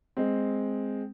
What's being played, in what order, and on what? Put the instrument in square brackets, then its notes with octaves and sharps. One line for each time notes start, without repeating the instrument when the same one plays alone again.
[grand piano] G#3 C4